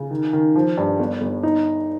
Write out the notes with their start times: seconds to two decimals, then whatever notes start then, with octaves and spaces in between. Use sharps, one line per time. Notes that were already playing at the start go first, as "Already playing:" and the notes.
Already playing: C#3
0.11 D#3
0.33 D#3
0.56 F3
0.77 G2
0.99 G1
1.21 G1
1.43 D#4